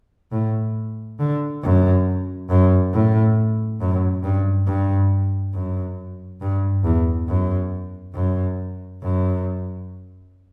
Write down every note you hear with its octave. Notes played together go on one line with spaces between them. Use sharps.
A2
D3
F#2
F#2
A2
F#2
G2
G2
F#2
G2
E2
F#2
F#2
F#2